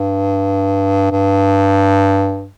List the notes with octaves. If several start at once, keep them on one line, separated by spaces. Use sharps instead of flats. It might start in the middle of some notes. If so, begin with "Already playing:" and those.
Already playing: G2
G2